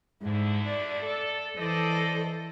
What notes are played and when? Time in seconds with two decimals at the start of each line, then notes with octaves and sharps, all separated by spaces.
0.22 D2 G#2 D3 E4
0.67 D5
1.02 A4
1.57 E3 A4 C5 D5 D#5